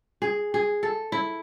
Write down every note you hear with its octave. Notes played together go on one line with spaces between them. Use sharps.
G#4
G#4
A4
E4